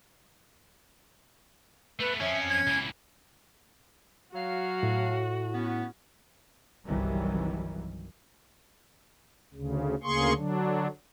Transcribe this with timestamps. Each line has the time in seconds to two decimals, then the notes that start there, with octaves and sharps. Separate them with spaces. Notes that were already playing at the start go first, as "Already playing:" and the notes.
2.00 A3 B3 B4
2.21 F2 F3 C#4 E5
2.49 G#6
2.67 C#2 E3
4.35 F#3 F#4 F5
4.83 A2
5.54 B3 C#4
6.86 G1 C2 D#3 E3 F#3 G3
9.54 D2 C#3
10.03 D2 C#3 A#3 G#4 C6 C#6
10.37 D3 F#3 D4